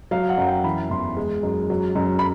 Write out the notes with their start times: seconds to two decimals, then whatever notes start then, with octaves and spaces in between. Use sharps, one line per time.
0.11 F#3 F5
0.29 F#5
0.38 F#2
0.47 G5
0.64 E3 B5
0.90 E2 C6
1.17 G#3
1.43 F#2
1.70 F#3
1.96 F#2
2.19 B5